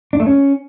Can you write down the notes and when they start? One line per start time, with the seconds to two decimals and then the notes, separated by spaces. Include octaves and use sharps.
0.13 D4
0.20 A3
0.27 C#4